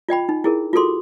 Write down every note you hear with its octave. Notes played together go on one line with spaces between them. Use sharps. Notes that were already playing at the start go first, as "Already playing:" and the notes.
F4 D#5 G5 B5
D#4
E4 G#4 A#4
F4 F#4 G#4 A4 C6 D6